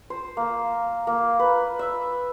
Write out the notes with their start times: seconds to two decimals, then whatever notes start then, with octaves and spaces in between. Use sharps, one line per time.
0.10 C5
0.37 A#3
1.07 A#3
1.39 B4
1.79 E5